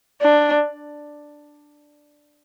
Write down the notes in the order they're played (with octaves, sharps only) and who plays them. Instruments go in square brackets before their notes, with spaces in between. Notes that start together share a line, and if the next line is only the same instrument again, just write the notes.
[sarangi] D4